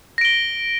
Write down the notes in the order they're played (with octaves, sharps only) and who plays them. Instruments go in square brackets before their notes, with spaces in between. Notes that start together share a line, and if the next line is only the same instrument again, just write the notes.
[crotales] A#6
D7
G7